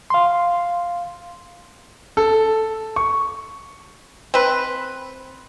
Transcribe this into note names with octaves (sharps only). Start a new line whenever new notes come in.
F5 C6
A4
C#6
C4 B4